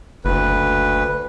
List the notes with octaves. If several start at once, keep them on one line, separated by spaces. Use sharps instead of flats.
F#1 D2 B4